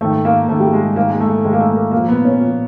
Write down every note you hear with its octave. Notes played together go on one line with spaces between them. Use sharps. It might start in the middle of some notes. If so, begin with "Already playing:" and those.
G#2 D#3 A3
A#3
G#2 D#3 A3
G3
G#3
G#2 D#3 A#3
G#3
A3
G#2 D#3 G#3
A#3
A3
A#3
A#2 F3 A#3
B3
C#4
A#2 F3